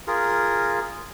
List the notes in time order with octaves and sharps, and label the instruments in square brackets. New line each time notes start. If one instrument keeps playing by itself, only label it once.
[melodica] F4 G#4 A#4